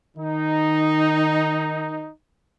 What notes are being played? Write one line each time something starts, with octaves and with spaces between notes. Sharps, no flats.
D#3 D#4